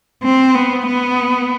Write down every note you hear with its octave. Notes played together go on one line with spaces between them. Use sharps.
C4
B3
B3